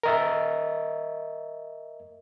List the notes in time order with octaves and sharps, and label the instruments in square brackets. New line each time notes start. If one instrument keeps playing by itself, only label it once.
[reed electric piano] A#4 D#5 E5